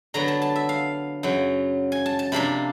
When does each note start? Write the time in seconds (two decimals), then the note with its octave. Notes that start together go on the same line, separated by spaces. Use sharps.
0.14 D3 F#3 B3 A#5
0.28 A5
0.42 A5
0.56 E5
0.69 F5
1.23 F#2 C#3 F#3
1.92 G#5
2.06 A5
2.19 A5
2.32 C3 F3 A#3 D4 B5